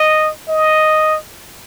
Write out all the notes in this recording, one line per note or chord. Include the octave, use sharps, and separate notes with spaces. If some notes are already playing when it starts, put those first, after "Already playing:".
Already playing: D#5
D#5